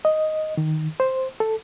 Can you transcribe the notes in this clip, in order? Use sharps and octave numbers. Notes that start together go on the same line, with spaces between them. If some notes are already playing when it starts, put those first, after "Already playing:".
D#5
D#3
C5
A4